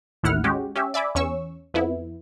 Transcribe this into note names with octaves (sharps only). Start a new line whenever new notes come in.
A1 D#2 E4 F#5 F6
G#3 C#4 F#4 G4
C#4 G4 E5
D5 E5 G#5 B5 D6
E2 C#4 C#6 E6
F2 B3 E4